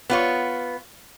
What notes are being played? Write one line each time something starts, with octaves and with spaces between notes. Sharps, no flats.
B3 F4 C#5